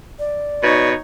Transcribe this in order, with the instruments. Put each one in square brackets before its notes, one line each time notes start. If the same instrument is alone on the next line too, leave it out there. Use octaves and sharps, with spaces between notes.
[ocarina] D5
[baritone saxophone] B2 [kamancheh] D#4 C#5